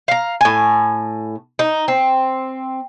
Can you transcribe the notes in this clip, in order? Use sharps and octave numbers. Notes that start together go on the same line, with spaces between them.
F5 A#5
A2 G#5
D#4
C4